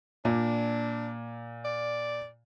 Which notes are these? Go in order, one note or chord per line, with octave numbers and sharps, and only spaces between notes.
A#2 D4
D5